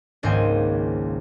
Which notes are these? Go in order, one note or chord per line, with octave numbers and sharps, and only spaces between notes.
G#1 C#2 G#2 A#3 C5 G#5